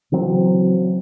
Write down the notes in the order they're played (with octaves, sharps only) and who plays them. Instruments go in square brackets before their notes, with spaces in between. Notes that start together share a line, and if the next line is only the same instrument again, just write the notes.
[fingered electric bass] C#3 E3 F#3 C4